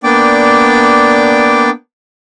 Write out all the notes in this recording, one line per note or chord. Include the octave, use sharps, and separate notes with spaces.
A#3 B3 D4 D5 G5 D6